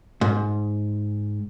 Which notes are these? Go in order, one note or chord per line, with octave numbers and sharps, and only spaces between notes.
G#2